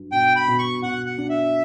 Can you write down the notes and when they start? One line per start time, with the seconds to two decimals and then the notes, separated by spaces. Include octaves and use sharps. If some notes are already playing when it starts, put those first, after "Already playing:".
Already playing: G2 F#3
0.12 B2 G5
0.36 B5
0.48 B2
0.59 C#6
0.83 B2 F#5
1.06 F#5
1.18 D4
1.29 E5